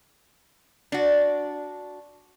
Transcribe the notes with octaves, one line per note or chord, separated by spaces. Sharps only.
D4 F#4